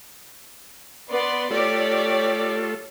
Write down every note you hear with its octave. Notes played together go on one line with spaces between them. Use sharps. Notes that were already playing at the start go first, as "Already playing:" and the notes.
B3 D5 C6
A3 F4 G4 A4 C#5 D5